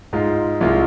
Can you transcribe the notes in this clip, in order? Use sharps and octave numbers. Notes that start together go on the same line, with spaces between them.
G#2 G#3 F4
C2 C3 G#3 F4